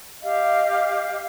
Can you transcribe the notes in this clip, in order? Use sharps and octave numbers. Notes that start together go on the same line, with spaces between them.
G4 D#5 F5